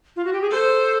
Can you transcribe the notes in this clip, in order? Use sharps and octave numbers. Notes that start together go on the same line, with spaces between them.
F4
F#4
G4
G#4
A4 C5